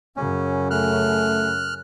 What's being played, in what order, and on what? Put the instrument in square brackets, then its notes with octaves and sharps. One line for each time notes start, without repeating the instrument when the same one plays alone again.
[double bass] F#2 C#3 [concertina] C#4
[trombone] A3 [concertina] F6 F#6